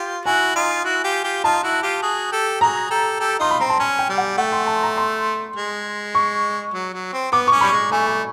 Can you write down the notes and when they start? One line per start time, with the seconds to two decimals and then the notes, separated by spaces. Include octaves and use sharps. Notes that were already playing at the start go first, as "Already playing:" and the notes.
Already playing: F4 G4
0.25 E4 F#4 G#5
0.55 D#4 F4
0.85 E4 F#4
1.04 F4 G4
1.24 F4 G4
1.44 D#4 F4 A5
1.63 E4 F#4
1.83 F4 G4
2.02 F#4 G#4
2.31 G4 A4
2.61 F#4 G#4 A#5
2.90 G4 A4
3.20 G4 A4
3.39 D#4 F4 C6
3.51 B5
3.60 C4 A#5
3.69 A5
3.79 C#4 G#5
3.99 G5
4.09 G3
4.18 F#5
4.37 A3 F#5
4.52 C6
4.67 A5
4.83 A#5
4.97 C6
5.56 G#3
6.15 C#6
6.74 F#3
6.93 F#3
7.13 C4
7.32 B3 D6
7.47 C#4 C#6
7.61 G3 B5
7.71 G#3
7.91 A3 G#5
8.06 G#5